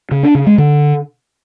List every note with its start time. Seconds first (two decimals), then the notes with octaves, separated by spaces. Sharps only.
0.11 C#3
0.23 D4
0.35 C#3
0.46 G#3
0.58 D3